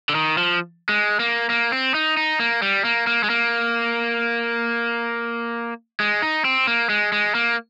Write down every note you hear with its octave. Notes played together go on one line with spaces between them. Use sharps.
D3
D#3
F3
G#3
A#3
A#3
C4
D#4
D#4
A#3
G3
A#3
A#3
G#3
A#3
G#3
D#4
C4
A#3
G#3
G#3
A#3